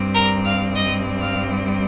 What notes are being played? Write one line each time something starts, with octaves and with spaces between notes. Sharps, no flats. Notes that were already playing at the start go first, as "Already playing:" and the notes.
Already playing: G2 G3 C4
A#4 A#5
F5 F6
D#5 D#6
F5 F6